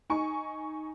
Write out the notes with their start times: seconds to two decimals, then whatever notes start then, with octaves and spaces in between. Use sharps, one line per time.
0.10 D#4 G#5 C#6